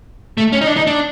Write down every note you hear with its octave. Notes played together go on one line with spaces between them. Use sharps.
A3
C#4
D#4
D4
D#4
D4